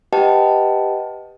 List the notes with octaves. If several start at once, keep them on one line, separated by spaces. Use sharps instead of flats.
G4 B4 D#5 F#5 G5 A5